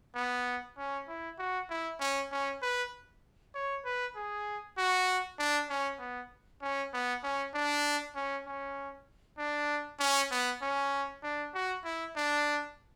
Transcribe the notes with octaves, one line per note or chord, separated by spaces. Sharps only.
B3
C#4
E4
F#4
E4
C#4
C#4
B4
C#5
B4
G#4
F#4
D4
C#4
B3
C#4
B3
C#4
D4
C#4
C#4
D4
C#4
B3
C#4
D4
F#4
E4
D4